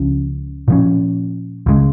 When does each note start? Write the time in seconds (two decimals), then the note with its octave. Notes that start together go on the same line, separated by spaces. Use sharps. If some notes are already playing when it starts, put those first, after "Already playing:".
Already playing: C#2 C#3 F3 C#4
0.68 A#2 F3 C#4
1.66 C#2 C#3 G#3